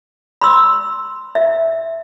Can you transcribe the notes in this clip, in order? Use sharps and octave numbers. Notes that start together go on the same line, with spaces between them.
B5 C6 E6
E5